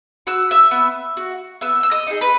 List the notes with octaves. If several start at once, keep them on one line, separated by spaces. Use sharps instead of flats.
F#4 E6
E5 E6
B3
F#4
B3 E5 E6
E6
D#5 D#6
D#4 G#4
B4 B5